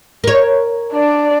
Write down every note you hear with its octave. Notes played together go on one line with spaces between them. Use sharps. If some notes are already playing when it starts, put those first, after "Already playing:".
A#4 C#5
D4 D5